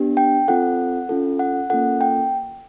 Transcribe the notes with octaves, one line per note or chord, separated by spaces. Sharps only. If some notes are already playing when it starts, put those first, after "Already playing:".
Already playing: B3 D4 G4
G5
C4 F4 A4 F#5
C#4 F4 A4
F#5
A#3 C#4 F4 A4 F#5
G5